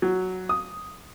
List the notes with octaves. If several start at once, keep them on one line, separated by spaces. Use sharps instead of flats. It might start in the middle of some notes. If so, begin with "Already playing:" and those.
F#3
D#6